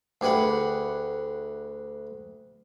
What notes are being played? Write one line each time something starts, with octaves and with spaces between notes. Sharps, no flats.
D2 G4 G#4 B4 F#5